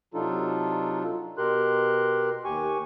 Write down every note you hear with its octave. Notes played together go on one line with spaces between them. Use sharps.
C3 F#3 D4 D#4 F4 A4
B2 G4 A#4 C6 F#6
D#2 G4 G#5 C#6